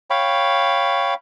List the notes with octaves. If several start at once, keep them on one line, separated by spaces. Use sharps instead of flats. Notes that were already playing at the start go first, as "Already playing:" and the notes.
C#5 F5 G5 B5